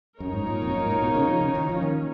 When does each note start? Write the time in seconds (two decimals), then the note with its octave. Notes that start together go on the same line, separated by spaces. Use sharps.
0.20 F#2 A#3 D#4 A#4 C#5
0.33 G#2
0.47 A#2
0.62 F2
0.72 F#2
0.82 G#2
0.91 A#2
1.01 B2
1.15 C#3
1.28 F3
1.41 C#3
1.55 D#3
1.69 F3
1.82 D#3 A#3 C#4